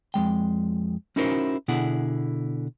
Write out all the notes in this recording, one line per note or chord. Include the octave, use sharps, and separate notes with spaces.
F2 G#3 G5
C#4 D#4 E4 F#4 A#4 C5
B2 D3 B3 E4 G#4 F#5